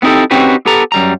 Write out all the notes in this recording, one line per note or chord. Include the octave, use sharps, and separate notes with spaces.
B3 C4 D#4 E4 G4 A4
C4 C#4 D#4 F#4 G4 B4
B3 G4 A4 A#5
F#2 G3 A#5